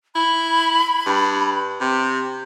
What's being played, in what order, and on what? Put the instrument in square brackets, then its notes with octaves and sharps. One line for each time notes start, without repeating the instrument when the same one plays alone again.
[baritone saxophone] E4 [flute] B5
[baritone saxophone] G2
C3